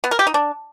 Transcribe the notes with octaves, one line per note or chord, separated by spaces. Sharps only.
B3
A#4
G4
D#4
D4